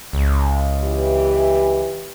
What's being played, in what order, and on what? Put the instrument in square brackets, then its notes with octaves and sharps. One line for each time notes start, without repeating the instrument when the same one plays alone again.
[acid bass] C#2
[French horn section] E3 G4